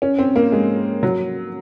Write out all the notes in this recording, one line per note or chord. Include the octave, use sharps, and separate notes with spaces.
C#4
C4
A#3
G#3
F#3